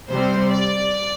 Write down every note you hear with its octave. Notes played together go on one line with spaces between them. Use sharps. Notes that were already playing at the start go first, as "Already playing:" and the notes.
C3 G3 C4 C5
D5